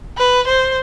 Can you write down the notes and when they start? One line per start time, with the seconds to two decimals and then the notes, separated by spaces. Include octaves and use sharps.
0.17 B4
0.48 C5